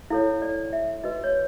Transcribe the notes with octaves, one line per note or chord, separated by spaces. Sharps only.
E4 A4 C#5 F5
D5
E5
F#4 B4 D#5
C#5